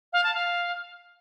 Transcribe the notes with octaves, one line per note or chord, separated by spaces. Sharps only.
F5
A5
F5